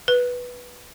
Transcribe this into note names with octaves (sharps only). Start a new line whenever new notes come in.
B4